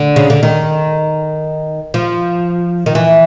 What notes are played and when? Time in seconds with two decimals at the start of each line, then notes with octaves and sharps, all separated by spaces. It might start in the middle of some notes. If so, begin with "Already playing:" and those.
Already playing: D3
0.16 C#3
0.30 D3
0.43 D#3
1.94 F3
2.86 D#3
2.95 E3